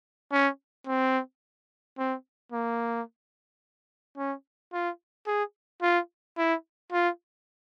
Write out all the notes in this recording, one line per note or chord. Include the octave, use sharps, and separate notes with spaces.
C#4
C4
C4
A#3
C#4
F4
G#4
F4
E4
F4